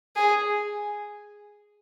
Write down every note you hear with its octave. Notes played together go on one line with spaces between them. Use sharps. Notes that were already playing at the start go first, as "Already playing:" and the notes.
G#4